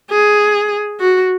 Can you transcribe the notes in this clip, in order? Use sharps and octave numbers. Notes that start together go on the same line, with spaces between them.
G#4
F#4